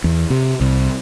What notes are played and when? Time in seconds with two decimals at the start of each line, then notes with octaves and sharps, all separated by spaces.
0.04 E2
0.30 C3
0.61 C2